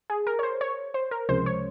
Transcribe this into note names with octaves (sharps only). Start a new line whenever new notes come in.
G#4
A#4
C#5
C5
C#5
C5
A#4
C#2 C3 F3 G#3 C#4 C5
C#5